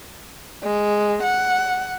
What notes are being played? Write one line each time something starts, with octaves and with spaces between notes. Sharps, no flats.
G#3
F#5